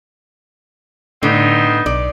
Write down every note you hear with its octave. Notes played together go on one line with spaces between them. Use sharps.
A2 D3 B3 C4 D#4
B1 D5